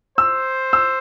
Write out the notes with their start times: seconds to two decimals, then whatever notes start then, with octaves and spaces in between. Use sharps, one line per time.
0.18 C5 E6
0.73 E6